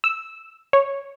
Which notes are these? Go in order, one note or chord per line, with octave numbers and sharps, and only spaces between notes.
E6
C#5